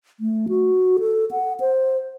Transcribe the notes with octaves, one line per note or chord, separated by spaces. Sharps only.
A3
F#4
A4
F#5
C5